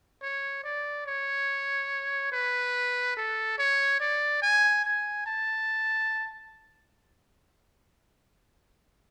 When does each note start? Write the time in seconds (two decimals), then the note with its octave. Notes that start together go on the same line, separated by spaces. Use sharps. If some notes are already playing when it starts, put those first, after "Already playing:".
0.22 C#5
0.64 D5
1.06 C#5
2.32 B4
3.17 A4
3.58 C#5
4.00 D5
4.42 G#5
4.84 G#5
5.26 A5